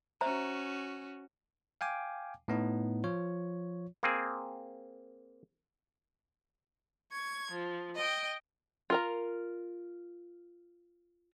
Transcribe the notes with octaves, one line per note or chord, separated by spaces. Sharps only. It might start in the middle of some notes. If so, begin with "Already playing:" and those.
C#4 F#4 C5 E5 A#5
F5 G5 G#5 D6
A2 B3 D#4
F3 F4 C#5
A#3 C4 G#4
C#6 G#6
F3
D#5 G5
F4 A#4 A#5